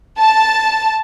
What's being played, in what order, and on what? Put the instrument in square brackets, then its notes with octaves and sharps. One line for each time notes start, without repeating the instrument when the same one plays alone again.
[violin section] A5